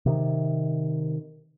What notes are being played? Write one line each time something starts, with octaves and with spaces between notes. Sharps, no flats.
C3 D#3